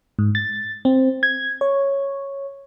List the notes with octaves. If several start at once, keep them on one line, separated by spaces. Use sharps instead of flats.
G#2
A6
C4
G#6
C#5